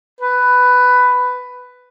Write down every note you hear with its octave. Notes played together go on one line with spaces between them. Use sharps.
B4